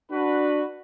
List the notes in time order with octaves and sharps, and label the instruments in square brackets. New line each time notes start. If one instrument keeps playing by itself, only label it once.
[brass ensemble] D4 F#4 B4